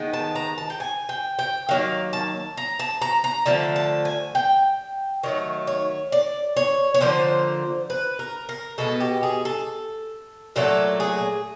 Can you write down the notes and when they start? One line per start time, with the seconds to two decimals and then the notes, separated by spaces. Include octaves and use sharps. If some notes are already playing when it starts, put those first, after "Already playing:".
Already playing: D#3 G#3 B3
0.13 A5
0.35 A#5
0.58 A5
0.70 G5
0.80 G#5
1.09 G5
1.39 G5
1.69 D#3 F#3 A#3 F5
2.13 A5
2.57 A#5
2.79 A5
3.02 A#5
3.24 A#5
3.46 D3 F3 A3 A5
3.76 A5
4.05 G#5
4.35 G5
5.23 D#3 F#3 A3 C#5
5.67 C#5
6.12 D5
6.57 C#5
6.94 C#5
7.01 D3 F3 A#3 C5
7.90 B4
8.19 A#4
8.49 A#4
8.78 B2 G#3 B3 A4
9.00 G4
9.23 G#4
9.45 A4
10.56 A#2 F#3 A3 A4
11.00 G#4